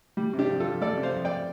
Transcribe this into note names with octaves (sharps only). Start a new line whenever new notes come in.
G3
C3
D4 G4
F2
F4 A4
F2
G3 A4 D5
C3
C5 F5
F2
D5 G5